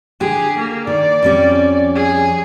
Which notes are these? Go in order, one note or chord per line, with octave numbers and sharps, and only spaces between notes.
D3 G4 G#4
A#3
D#3 D5
F2 G3 C#4
G#4